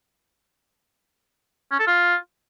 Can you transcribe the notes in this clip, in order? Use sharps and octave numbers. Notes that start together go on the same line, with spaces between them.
C#4
A4
F4